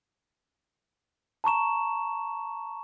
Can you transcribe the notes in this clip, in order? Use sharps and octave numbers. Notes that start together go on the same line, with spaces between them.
A5 A#5 C#6 E7